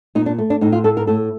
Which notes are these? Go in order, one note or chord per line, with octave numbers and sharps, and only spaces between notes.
A#2 D#4
D4
A3
D4
A2 D#4
F4
A3 A4
A#4
A2 A4